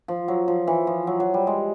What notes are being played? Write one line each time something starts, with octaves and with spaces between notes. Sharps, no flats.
F3
F#3
F3
E3
F3
F#3
F#3
G3
G#3